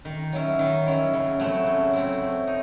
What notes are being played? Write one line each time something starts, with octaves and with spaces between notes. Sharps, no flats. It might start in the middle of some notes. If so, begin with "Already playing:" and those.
D#3
F#3 C#4 E4
D#3
F#3 C#4 E4
C#3
F#3 A3 C4 E4
C#3
F#3 A3 C4 E4
C4
D#4